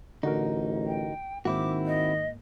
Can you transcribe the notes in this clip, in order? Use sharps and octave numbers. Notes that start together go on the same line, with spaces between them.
A1 D3 D#4 F#4 A#4
G5
G#2 D#3 A#3 C4 E4 F#4 D6
D#5